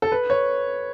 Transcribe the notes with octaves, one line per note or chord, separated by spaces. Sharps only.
A4
B4
C#5